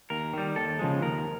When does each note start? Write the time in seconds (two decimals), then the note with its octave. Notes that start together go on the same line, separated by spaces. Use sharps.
0.10 D#2 A#4
0.34 D#3 G3
0.56 D#2 A4
0.79 C#3 F3 G#3
1.02 D#2 A#4